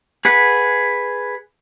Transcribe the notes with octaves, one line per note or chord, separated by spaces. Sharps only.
G#4 B4 F#5